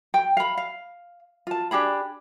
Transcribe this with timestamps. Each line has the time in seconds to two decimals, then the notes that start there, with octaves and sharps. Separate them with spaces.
0.14 G5
0.37 F5 B5
0.57 F5
1.47 F4 A5
1.71 D4 G4 G#4 B5